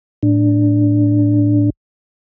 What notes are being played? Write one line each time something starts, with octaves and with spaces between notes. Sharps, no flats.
A2 D4